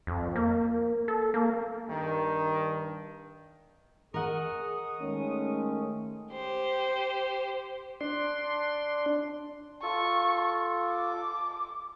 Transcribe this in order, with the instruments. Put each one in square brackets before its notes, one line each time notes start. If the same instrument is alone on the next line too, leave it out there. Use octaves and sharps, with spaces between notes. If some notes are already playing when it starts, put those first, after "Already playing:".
[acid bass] F2
A#3
A4
A#3
[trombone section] G2 D#3
[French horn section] G#4 [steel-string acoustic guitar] A#4 F#5 [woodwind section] D#5 C#6 D#6
[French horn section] D#3 G#3 A3 [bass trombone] C#4
[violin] G4 C5
[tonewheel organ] D4 C6
[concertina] F4 A4 [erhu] C#6
[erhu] D6